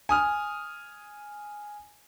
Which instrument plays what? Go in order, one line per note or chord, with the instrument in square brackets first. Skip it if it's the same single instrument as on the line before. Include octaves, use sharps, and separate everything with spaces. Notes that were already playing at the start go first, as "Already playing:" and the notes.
[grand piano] G#5 D#6 F6